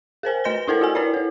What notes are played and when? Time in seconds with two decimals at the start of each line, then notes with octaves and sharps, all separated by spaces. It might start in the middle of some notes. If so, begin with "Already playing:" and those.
0.23 G#4 A#4 C5 G#5
0.44 A3 B4 D#5 G6 A#6 G7
0.68 D4 E4 A4 A#4 C5
0.81 F4 F#4 F#5 G#5
0.95 E4 A#4 B4 C#5 D5
1.14 E4 A4